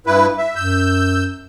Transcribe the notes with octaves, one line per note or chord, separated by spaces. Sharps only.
G2 E4 B4
E5
F#2 E6 G6